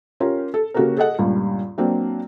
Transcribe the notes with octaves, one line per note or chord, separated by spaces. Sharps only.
C#4 F4 G4 A#4
A4
C#3 A#3 F#4 G4 A4 A#4
G#4 A4 D#5 F#5
C#2 G2 A#2 G3
F#3 A#3 C4 D4